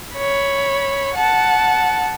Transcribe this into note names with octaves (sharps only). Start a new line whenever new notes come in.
C#5 B5
F#5 A5